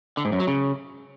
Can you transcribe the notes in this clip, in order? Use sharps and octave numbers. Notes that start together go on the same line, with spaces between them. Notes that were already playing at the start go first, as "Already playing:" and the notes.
D3
G#2
F#2
F#3
C#3